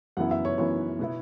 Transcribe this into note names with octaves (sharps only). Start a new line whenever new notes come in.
F#2 E3 B3 E4 F#5
E5
C#5
F#2 E3 B3 E4 C#5
B2 B3 E4